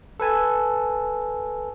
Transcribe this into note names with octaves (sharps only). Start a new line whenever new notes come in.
A4 B4 G#5 A5